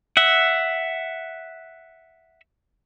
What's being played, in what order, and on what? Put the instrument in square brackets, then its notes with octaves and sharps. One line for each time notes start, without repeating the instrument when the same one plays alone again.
[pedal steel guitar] E5 F#5